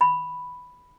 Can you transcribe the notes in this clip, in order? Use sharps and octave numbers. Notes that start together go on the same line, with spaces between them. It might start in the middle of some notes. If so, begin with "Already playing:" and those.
B5